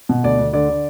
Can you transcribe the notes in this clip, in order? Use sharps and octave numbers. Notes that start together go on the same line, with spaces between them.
B2
D2 D5
D2
D3 D5
D3